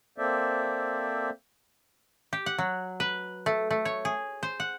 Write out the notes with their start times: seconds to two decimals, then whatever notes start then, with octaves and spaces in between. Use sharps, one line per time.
0.18 A#3 C4 A4 C5 D5 E5
2.33 G4
2.46 F#5
2.58 F#3
3.00 B4
3.46 A3
3.70 A3
3.85 C#5
4.05 G#4
4.43 C5
4.60 F#5